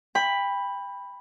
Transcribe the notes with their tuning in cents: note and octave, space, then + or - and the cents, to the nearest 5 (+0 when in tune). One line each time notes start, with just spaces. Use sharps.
G5 +30 B5 +0